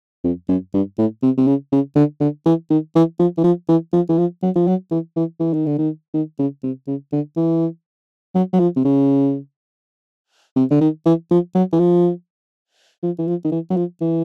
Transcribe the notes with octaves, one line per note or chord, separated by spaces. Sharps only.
F2
F#2
G2
A2
C3
C3
C#3
C#3
D3
D3
E3
D#3
E3
F3
E3
F3
E3
F3
E3
F3
F#3
F3
F#3
E3
E3
E3
D#3
D3
D#3
D#3
C#3
C3
C#3
D3
E3
F#3
F#3
F3
C3
C#3
C3
D3
D#3
E3
F3
F#3
E3
F3
F3
E3
F3
D#3
E3
F#3
F3
E3